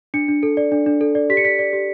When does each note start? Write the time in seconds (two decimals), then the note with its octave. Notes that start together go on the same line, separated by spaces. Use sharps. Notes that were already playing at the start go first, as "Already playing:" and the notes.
0.14 D4 C#7
0.28 D4
0.43 A4
0.57 D5
0.72 D4
0.86 D4
1.01 A4
1.15 D5
1.30 G4 B6
1.37 C#7
1.44 D5 B6
1.59 D5
1.73 G4